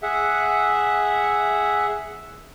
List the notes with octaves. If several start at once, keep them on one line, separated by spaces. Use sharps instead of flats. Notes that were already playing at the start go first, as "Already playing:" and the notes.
G#4 E5 F#5